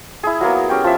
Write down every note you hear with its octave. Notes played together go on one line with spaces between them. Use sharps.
E4 G#4
F#3 A#3 B3
C#4 G4
F3 E5